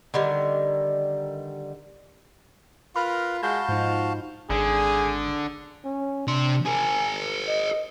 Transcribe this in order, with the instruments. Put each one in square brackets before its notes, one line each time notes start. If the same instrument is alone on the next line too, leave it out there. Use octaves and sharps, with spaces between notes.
[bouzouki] D3 D#3 G3
[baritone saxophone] F4 [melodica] A#4 B4 A#5 [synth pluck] B5
[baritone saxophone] G#3 [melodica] F#4 F5 A5 [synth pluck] G6
[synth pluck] G#2 D#4 [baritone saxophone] F3
[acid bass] G#1 [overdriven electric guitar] D3 [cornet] G#4
[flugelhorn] C#4
[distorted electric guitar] C3 C6 [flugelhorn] D4
[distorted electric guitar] G#4 A#4 [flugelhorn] G#5
[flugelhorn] D#5